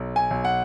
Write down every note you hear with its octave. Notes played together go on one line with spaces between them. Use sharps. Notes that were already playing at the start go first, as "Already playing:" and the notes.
Already playing: B1
G#5
B1
F#5